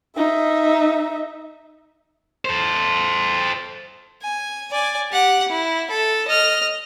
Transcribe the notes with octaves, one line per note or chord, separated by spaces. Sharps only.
D#4 E5
A4 C5
G#5
D5 G#5
G4 F#5
E4
A4
D#5 F6